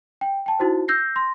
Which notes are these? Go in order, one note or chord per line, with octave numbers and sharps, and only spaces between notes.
G5
G5 A5
D#4 E4 F#4 C5
E6 G6 A#6 C7
C6 A#6